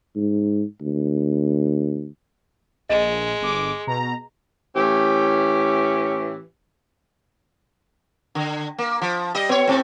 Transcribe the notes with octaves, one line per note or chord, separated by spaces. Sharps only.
G#2
D2
A#1 G#3 D#5
G1 D6
B2 A#5
A2 E3 C#4 G4
D3
A#3
F3
G3 D#5
B3 C#5
A2 C4